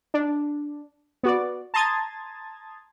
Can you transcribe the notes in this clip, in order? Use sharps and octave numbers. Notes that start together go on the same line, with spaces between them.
D4
B3 F#4 D5
A5 A#5 C6 D#6 G#6 A6